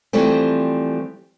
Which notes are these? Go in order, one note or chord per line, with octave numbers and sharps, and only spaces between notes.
E3 F3 G3 A3 C4